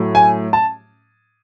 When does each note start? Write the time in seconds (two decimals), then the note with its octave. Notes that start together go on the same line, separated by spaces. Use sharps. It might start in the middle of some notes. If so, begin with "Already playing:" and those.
Already playing: A2 F#3 A3
0.15 G#5
0.53 A5